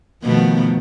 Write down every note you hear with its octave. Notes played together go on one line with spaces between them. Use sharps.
B2 D#3 F3 A3 B3